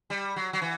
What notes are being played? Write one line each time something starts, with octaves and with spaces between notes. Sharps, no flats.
G3
F#3
F#3
E3